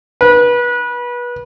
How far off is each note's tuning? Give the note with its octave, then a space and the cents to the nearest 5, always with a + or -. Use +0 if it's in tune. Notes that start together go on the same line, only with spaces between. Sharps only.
B4 -25